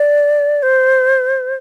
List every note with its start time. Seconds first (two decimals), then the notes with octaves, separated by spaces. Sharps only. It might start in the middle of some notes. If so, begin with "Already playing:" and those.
Already playing: D5
0.63 C5